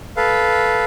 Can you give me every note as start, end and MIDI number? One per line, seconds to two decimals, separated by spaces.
0.17 0.85 69
0.17 0.85 71
0.17 0.85 77